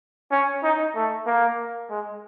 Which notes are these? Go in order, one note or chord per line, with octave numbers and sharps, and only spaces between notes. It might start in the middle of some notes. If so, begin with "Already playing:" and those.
C#4
D#4
A3
A#3
G#3